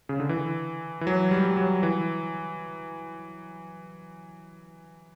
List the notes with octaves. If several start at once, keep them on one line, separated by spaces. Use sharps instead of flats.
C#3
D3
E3
E3
F#3
G3
G3
F#3
E3